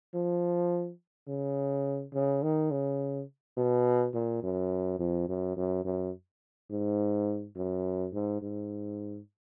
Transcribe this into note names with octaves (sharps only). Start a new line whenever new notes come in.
F3
C#3
C#3
D#3
C#3
B2
A#2
F#2
F2
F#2
F#2
F#2
G#2
F#2
G#2
G#2